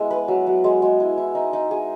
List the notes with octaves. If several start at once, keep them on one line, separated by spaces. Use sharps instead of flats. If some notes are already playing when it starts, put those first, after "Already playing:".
Already playing: G#3 B3 E4 E5
B4
F#3
F#3
G#3
G#3
E4
E4
D#4
D#4
G#4